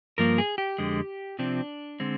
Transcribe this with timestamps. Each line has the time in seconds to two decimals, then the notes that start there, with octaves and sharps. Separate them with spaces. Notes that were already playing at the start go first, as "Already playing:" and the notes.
0.18 G2 F3 A#3 A#4
0.38 G#4
0.58 G4
0.78 F2 D3 G#3
1.39 C3 F3 C4 D4
2.00 D3 G#3 C4